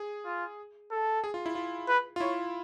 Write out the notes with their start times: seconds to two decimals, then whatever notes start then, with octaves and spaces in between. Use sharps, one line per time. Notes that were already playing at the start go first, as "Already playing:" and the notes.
Already playing: G#4
0.25 F4
0.91 A4
1.24 G#4
1.34 F4
1.46 E4
1.55 F4
1.88 B4
2.16 F4
2.20 E4 C#5